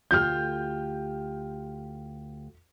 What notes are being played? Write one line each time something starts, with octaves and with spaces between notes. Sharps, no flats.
D2 F4 G4 F6 G6